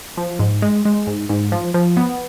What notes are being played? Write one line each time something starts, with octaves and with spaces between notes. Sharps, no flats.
F3
G#2
G#3
G#3
G#2
G#2
F3
F3
B3